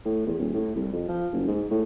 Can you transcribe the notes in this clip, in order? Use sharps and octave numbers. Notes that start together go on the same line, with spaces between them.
A2
E2
D#1
A2
C2
F2
F3
F#1
G#2
A2